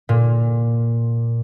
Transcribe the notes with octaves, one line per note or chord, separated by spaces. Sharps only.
A#2